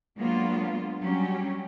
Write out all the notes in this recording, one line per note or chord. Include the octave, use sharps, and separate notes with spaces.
F#3 G#3 A#3 B3 D4 F4
F#3 G3 C#4 G4